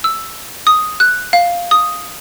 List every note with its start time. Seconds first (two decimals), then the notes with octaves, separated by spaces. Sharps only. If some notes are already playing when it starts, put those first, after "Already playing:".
0.04 E6
0.67 D#6
1.00 F#6
1.33 F5
1.71 D#6